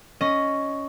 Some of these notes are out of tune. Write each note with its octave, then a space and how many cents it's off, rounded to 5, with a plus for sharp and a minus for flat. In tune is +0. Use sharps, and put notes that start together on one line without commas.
C#4 +5 D#5 +0